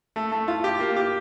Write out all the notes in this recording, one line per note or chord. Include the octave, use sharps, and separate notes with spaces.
A3
A3
F4
G4
A#3
G4